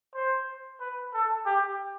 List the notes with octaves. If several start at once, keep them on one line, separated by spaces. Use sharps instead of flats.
C5
B4
A4
G4